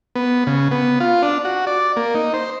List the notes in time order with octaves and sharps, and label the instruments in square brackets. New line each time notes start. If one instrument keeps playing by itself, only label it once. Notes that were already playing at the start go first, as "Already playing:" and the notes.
[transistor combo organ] B3
C#3
B3
F4
D4
F#4
D5
A#3
D#4
C5